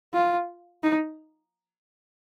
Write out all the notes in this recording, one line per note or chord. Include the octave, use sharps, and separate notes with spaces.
F4
D#4